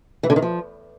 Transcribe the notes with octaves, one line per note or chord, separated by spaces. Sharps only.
E3
D3
D#3
F3